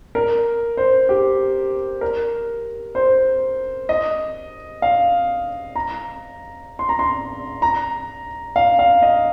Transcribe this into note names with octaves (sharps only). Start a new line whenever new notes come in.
A#4
C5
G4
A#4
C5
D#5
F5
A#5
C6
A#5
C6
A#5
F5
F5
D#5